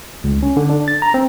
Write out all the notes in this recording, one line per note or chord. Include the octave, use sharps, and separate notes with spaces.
C#2
C#4
D3
D4
A6
A#5
C4